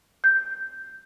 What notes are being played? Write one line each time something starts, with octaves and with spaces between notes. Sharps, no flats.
G6